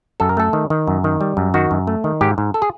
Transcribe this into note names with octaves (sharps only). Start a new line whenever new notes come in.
F#2 A4
A#4
A3 A4
D#3
D#3
F#2
D#3
G3
F#2
D#3 F#4
F#2
A3
D#3
G#2 G4
G#2
A4
G#4